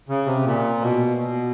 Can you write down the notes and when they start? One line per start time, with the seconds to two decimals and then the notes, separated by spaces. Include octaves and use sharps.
0.09 C#3
0.26 C3
0.45 A#2
0.81 B2
1.17 B2